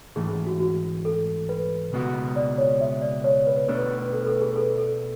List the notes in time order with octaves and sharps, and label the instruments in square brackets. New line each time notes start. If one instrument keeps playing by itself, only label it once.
[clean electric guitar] G#2 E3 A3 [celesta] G#4
[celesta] F#4
F#4
A4
B4
[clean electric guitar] C#2 B2 G#3 B3 F#4
[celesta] D5
C#5
E5
D5
C#5
B4
[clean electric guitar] B2 A3 D4 [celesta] B4
[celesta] B4
A4
B4
A4
G#4
B4
A4
A4